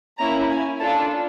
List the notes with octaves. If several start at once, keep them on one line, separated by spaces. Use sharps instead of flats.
A#3 C#4 E4 A#5
G#5
D4 F4 A4 A5